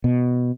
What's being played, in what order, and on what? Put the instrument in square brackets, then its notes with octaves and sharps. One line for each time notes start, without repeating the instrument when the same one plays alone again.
[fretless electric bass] B2